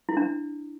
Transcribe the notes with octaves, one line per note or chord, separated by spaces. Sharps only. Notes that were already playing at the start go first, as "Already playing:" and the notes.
E4
D4